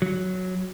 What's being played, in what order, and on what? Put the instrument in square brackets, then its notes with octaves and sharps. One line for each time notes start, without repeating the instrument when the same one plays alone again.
[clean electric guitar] F#3